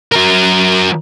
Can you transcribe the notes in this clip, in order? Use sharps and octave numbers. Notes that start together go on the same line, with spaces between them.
F#3 A#4